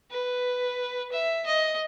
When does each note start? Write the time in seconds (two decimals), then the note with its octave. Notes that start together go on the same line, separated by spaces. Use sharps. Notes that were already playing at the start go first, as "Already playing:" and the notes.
0.11 B4
1.12 E5
1.46 D#5